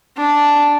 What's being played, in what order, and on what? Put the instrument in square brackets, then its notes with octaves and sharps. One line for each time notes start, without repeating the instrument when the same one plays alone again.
[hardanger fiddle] D4